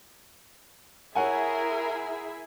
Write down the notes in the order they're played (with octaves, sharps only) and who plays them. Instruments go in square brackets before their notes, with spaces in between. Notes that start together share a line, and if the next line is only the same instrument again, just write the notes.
[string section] E4 G#4 E5 [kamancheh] A#4 [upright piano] C#5 F#5 G#5